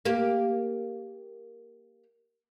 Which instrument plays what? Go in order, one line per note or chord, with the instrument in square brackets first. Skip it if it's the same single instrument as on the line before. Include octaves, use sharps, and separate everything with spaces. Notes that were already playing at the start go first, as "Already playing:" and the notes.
[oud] A#3 G4